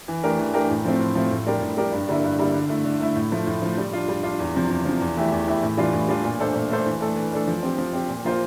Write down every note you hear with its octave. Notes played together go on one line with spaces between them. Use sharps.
E3
A3 D4 G4 A#4
E3
A3 D4 G4 A#4
A2
F3 A3 C4
A2
F3 A3 C4
A2
G3 D4 G4 A#4
A2
G3 D4 G4 A#4
G2
D3 G3 A#3 E4
G2
D3 G3 A#3 E4
D3
A3 E4
D3
A3 E4
A2
F3 A3
A2
F3 A3
G3
D4 F4
G3
D4 F4
E2
C3 F3
E2
C3 F3
E2
E3 A3 E4 G4
E2
E3 A3 E4 G4
A2
E3 G3 D4 F4
A2
E3 G3 D4 F4
A#2
A3 D4 A4 C5
A#2
A3 D4 A4 C5
E3
A3 D4 A4
E3
A3 D4 A4
F3
C4 G4
F3
C4 G4
A#2
F3 A#3 F4 C5